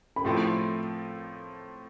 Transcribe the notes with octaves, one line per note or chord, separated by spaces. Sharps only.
B5
A2 F3 A3 C4 E4 C6